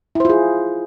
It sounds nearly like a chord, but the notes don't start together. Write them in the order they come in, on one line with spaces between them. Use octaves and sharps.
E4 C5 F4 G#4